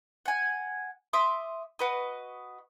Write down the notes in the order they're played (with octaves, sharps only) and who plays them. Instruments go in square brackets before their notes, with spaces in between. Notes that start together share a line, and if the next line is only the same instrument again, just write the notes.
[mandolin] F#5 G#5
E5 C6 D6 D#6
F#4 B4 D#5